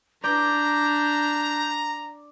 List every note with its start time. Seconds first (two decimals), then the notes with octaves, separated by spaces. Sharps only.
0.24 D4 D5 A#5 G6